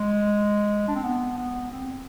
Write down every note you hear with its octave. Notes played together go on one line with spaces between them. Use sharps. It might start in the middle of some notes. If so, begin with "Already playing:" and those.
Already playing: G#3
D4
C4
B3
B3
C4